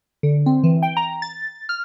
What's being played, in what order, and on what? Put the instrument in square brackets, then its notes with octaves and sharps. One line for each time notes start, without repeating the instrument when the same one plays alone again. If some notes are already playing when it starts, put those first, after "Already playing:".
[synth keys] D3
C4
E3
G5
A#5
A6
F6